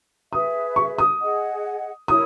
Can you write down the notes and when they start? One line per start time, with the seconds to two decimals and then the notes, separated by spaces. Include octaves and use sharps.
0.33 G#4 B4 E5 D#6
0.76 C#6
0.98 D#6
1.21 G#4 D#5 F#5
2.08 E4 A#4 C#5 D#6